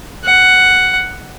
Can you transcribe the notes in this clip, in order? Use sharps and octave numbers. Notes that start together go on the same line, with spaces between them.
F#5